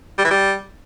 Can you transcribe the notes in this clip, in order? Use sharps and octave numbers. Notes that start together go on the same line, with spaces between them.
G3
E3
G3